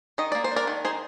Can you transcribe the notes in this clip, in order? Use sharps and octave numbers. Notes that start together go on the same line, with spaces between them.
D#3 D#5
A#3 D5
C5
D4 A#4 D5
D#3
D#4 G#4 C5